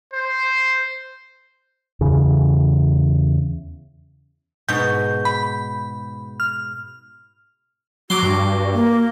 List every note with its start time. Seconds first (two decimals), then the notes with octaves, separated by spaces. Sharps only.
0.13 C5
2.01 E2 C#3
4.68 G#2 B2 G6
5.25 B5
6.40 F6
8.10 F#3 F#4 C6 D6
8.23 G2
8.73 A#3